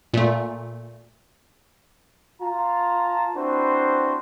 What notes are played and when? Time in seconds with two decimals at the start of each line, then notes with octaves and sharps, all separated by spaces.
0.14 A#2 A3
2.41 F4 A5 A#5
3.36 C4 D4 E4 F#4 B4 C5